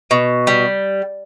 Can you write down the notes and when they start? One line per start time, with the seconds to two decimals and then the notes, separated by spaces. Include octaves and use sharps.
0.11 B2
0.47 G3